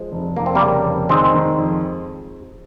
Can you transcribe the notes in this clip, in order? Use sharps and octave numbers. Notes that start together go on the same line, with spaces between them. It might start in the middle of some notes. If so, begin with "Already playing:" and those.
Already playing: F3 G#3
F1
F1 A#3
C4
G3 A#3
C#3
F1
D#3 G#3 C4
D#3
F2